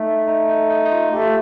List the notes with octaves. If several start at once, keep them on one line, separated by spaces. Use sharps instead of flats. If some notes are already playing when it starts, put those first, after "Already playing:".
Already playing: A3 D#4
D#4
D#4
D#4
D#4
F4
A3 G4
F4